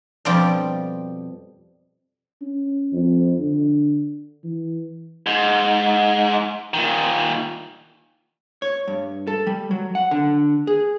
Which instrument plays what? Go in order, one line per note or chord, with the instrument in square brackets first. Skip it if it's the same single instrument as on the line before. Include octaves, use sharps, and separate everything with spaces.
[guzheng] F2 B2 F3 G3 D5 G5
[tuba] C#4
F2
D3
E3
[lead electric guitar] G#2
A#2 D#3
[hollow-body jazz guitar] C#5
G2
A4
G3
F#3
F#5
D3
G#4